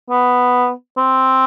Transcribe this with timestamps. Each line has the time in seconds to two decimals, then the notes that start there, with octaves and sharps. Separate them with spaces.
0.10 B3
0.97 C4